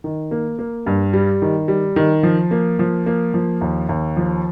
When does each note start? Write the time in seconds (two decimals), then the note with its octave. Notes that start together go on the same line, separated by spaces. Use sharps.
0.04 D#3
0.31 A#3
0.59 A#3
0.86 G2
1.13 G3
1.42 D#3
1.68 G3
1.96 D#3
2.23 F3
2.51 A#3
2.79 F3
3.06 A#3
3.34 F3
3.61 D#2
3.89 D#2
4.17 F3